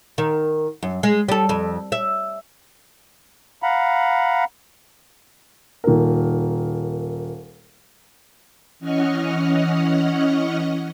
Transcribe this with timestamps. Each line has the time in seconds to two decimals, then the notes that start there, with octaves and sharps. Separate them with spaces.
0.18 D#3
0.83 F#2
1.03 G#3
1.29 G3 A4
1.49 F2
1.92 E5
3.63 F5 F#5 A#5 B5
5.84 D#1 A#4
8.80 E3 C#4 D#5 F#5 C#6 F6